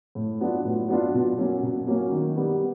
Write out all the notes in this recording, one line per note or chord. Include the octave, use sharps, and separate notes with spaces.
A2
F#3 B3 D4 F4
A2
F#3 B3 D4 F4
B2
F#3 A#3 C#4
B2
F#3 A#3 C#4
D#3
G3 B3